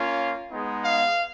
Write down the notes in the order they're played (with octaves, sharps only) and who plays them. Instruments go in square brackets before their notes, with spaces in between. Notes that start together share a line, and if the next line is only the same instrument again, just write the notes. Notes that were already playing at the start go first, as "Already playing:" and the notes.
Already playing: [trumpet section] A#3 C#4 F4
G#3 B3 D#4
F5